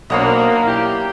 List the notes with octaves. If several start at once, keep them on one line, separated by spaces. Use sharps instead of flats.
B1 A#3 D4 C5 C#5 F#5 B5 D#6
E4 G4